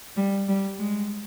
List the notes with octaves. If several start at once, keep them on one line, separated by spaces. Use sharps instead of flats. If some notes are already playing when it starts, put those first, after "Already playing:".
G3
G3
G#3